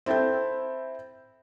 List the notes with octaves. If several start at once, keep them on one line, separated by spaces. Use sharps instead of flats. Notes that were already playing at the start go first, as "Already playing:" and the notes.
C4 E4 A4 G5 G6